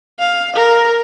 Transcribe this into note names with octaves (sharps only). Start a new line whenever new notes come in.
F5
A#4